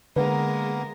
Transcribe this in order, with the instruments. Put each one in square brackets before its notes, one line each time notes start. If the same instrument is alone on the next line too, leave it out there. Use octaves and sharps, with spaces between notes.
[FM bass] D3 [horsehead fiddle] G#3 A#4 [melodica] A#3 B3 [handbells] B4